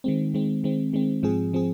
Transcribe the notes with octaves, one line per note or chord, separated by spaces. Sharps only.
D#3 G#3 C4
D#3 G#3 C4
D#3 G#3 C4
D#3 G#3 C4
G#2 F3 C4 G#4
F3 C4 G#4